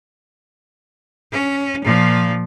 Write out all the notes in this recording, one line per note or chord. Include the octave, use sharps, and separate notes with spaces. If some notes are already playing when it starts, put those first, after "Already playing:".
C#4
A#2 F3